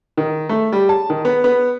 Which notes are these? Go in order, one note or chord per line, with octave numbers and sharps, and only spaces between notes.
D#3
A3
G3
A5
D#3
B3
B3